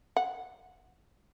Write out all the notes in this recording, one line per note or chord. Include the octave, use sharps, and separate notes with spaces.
F#5